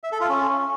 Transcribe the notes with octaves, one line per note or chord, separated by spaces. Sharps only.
E5
A4
F4
C#4